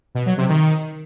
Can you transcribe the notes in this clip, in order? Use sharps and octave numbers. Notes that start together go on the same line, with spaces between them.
B2
F#3
C3
D#3